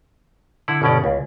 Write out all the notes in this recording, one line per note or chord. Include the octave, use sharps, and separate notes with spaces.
D3 E4 F#5
G1 B2 C#4 D5
C#2